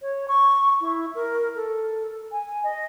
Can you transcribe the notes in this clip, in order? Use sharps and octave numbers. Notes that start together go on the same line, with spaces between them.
C#5
C#6
E4
A#4
A4
G#5
D#5